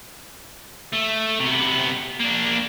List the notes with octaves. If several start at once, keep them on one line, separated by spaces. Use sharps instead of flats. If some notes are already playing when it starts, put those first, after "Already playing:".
A3
C3 B3
A#3 D4